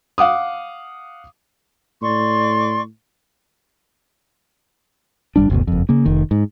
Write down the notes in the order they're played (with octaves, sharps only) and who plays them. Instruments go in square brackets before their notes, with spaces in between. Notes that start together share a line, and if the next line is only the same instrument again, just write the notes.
[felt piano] F5 F#5 D6 D#6
[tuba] A2 [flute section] D5 C6 C#6
[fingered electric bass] G1 F#2 G3 D4
F#1 D2 B2
F#1 F2
C#3 A#3
F1 D#3
G#2